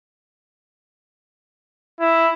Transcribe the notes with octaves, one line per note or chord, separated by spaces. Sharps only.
E4